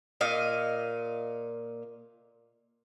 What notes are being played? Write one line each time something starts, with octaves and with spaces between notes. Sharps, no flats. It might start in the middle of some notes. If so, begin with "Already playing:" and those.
A#2 D#5 F5